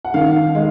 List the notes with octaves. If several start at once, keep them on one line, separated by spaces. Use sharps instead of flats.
F#5
D#3 F5
G#3